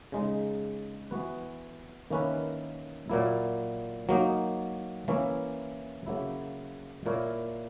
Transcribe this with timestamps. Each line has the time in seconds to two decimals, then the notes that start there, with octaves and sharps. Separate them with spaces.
0.12 C#3 G#3 D#4
1.11 E3 B3 F#4 B4
2.10 D#3 A#3 C#4 E4 B4
3.10 A#2 F#3 A#3 E4
4.09 F#3 A#3 D#4
5.08 E3 A#3 C#4 E4
6.07 C#3 F#3 A#3 E4
7.06 A#2 A#3 E4 A#4 C#5